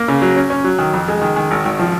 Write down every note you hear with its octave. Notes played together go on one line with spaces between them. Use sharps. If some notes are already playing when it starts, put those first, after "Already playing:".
Already playing: A#3
C#3
F#3
C#4
C#4
F#3
D#3
F2
G#3
D#3
D#3
G#1
G#1
F3